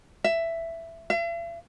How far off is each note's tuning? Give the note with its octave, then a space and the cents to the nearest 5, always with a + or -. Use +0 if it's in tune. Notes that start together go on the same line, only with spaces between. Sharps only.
E5 +10
E5 +45